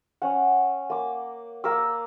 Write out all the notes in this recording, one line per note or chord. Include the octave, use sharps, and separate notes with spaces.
C#4 F#5
A#3 D6
A#3 A#4 D6 E6